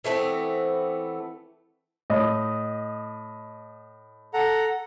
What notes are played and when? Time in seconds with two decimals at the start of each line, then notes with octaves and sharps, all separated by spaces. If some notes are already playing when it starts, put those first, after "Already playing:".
0.04 E3 A3 B3 C4
2.10 A2 D#5
4.34 A4 F#5 A#5